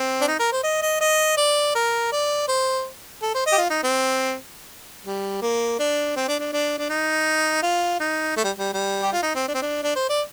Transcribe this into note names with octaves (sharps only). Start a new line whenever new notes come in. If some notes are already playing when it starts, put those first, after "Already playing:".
Already playing: C4
D4
D#4
A#4
C5
D#5
D#5
D#5
D5
A#4
D5
C5
A4
C5
D#5
G4
F4
D#4
C4
G3
A#3
D4
C4
D4
D4
D4
D4
D#4
F4
D#4
A3
G3
G3
G3
G4
F4
D#4
C4
D4
C4
D4
D4
C5
D5